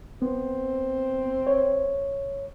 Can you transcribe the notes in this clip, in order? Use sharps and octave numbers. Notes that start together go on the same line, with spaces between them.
B3 C4
C#5